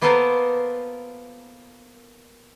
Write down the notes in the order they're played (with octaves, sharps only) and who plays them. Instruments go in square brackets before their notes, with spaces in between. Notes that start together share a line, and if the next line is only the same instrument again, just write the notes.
[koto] A#3 B3 F4 A4 A#4 C5